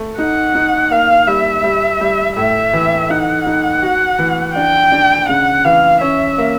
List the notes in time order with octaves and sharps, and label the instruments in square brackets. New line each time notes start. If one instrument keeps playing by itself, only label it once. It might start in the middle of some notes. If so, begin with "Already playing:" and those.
Already playing: [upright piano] A3
[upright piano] D#4 [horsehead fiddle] F#5
[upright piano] D#4
[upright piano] A#3 [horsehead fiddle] F5
[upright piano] G3 [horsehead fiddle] E5
[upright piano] G3
G3
[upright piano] A2 [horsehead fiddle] E5
[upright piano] E3
[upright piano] D#4 [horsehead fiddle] F#5
[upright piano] D#4
F#4
E3
[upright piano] D4 [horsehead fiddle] G5
[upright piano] D4
[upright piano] C#3 [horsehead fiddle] F#5
[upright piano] E3 [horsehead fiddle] F5
[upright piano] C#4 [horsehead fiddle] E5
[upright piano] A#3